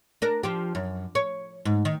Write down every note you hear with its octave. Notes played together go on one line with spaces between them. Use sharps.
D4 A#4
F3 G4
F#2
C#5
G#2
D#3